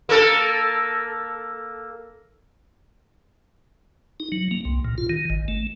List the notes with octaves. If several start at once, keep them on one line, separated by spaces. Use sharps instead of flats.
A#3 A4 A#4
D#4
F#3
A#3
C2
A#2
F4
D#3
G#1
A3